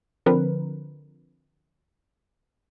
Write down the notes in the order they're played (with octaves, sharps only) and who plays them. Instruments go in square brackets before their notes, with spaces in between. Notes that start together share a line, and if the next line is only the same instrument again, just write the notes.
[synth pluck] D3 F3 C4 A#4 B4